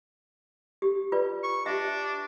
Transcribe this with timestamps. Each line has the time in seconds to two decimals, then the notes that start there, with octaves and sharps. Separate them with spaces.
0.82 G4
1.12 F4 B4 D5
1.43 C#6
1.66 D4 G4 E5